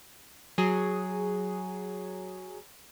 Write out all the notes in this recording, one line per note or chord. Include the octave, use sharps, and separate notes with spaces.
F#3 G#4